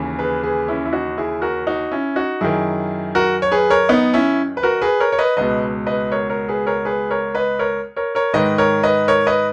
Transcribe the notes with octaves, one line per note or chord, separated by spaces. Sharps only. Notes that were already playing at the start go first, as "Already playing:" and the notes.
Already playing: D#2 C#3 E3
G#4 B4
G#4 B4
C#4 E4
E4
D#4 F#4
E4 G#4
F#4 A#4
D#4 F#4
C#4 E4
D#4 F#4
F#2 D#3 E4 G#4
F#4 A#4
C#5
G#4 B4
A#4 C#5
B3 D#4
C#4 E4
B4
F#4 A#4
G#4 B4
A#4 C#5
C#5
B4 D#5
C#2 B2 B4 D#5
B4 D#5
A#4 C#5
A#4 C#5
G#4 B4
A#4 C#5
G#4 B4
A#4 C#5
B4 D#5
A#4 C#5
A#4 C#5
A#4 C#5
G#2 D#3 B4 D#5
A#4 C#5
B4 D#5
A#4 C#5
B4 D#5